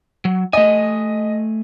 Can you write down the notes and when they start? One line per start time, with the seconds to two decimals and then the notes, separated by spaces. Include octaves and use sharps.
0.25 F#3
0.53 A3 D#5 G#5